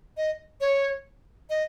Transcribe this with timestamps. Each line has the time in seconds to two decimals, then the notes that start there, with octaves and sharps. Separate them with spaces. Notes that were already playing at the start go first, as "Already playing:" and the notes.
0.17 D#5
0.61 C#5
1.50 D#5